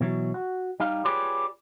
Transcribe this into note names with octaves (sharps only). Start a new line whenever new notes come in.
B2 E3 F#3
F#4
G3 D#4 F5
F4 G4 G#4 B4 C#5 D5